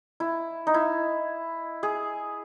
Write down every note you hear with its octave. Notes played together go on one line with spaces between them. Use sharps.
E4
D#4
E4
G#4